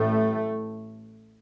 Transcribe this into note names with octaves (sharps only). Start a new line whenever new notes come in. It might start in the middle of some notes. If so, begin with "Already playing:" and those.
Already playing: A1 A2 A3